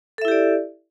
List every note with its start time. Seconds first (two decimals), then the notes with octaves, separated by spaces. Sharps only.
0.18 A4
0.22 E5
0.25 E4
0.28 G4
0.31 D5